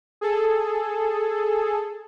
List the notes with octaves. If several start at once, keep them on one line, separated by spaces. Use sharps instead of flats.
G#4 A4